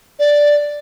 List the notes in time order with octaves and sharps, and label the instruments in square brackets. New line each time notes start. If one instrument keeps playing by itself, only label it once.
[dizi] D5